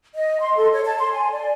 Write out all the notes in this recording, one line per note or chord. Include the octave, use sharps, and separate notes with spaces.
D#5
C6
A4
C#5
A5
C6
G#5
D5